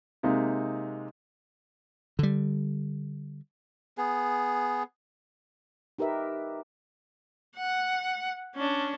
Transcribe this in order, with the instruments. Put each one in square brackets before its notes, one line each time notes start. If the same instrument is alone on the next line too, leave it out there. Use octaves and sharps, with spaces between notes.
[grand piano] C3 G#3 A#3 D#4
[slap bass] D3 G3
[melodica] B3 G#4
[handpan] D#4 G4 A#4 B4 E5
[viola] F#5
C#4 D4